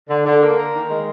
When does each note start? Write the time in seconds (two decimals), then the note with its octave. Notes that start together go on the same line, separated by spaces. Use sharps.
0.09 D3
0.26 D3
0.41 A#3
0.57 A#4
0.73 D#3
0.90 G#3